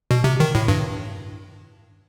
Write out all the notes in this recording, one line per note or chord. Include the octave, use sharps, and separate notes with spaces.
B2
C3
D#3
A2
G2